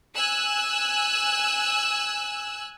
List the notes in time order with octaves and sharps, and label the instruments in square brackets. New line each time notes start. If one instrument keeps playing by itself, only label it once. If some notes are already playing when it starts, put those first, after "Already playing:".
[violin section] G#5 E6 F#6